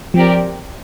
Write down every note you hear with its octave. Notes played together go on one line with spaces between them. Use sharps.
F3 C4 G4 A#4 D5